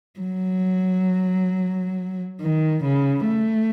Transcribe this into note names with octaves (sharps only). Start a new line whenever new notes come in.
F#3
D#3
C#3
A3